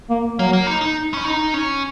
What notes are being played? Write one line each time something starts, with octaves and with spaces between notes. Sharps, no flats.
A#3
F#3 A#3
A#3
D#4
D#4
C#4
D#4
C#4